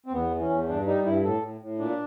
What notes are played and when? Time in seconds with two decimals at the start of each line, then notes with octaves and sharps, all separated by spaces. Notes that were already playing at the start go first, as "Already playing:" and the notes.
0.06 C4
0.13 E2 B3
0.31 E3
0.40 C#4
0.50 E2
0.68 G2 D4
0.87 G3 D#4
1.05 G2 E4
1.24 A2 A4
1.42 A2
1.61 A2
1.79 A#2 D4